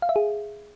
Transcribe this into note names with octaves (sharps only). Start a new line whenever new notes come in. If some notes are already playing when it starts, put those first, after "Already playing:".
F5
E5
G#4